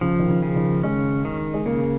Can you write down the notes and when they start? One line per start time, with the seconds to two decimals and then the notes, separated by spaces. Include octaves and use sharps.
0.01 C#3 F3
0.19 D#3
0.28 C#3
0.43 C#3
0.56 D#3
0.83 G#3 C#4
1.25 D#3
1.54 G#3
1.66 C#3 A#3